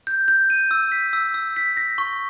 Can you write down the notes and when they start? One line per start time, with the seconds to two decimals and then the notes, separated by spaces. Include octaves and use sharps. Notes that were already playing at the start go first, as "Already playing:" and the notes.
0.07 G6
0.28 G6
0.50 D#7
0.71 E6
0.92 B6
1.13 E6
1.34 E6
1.57 B6
1.77 A#6
1.98 C#6